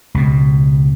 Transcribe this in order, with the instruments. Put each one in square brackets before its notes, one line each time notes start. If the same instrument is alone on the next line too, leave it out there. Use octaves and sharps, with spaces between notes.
[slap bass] C#2 B2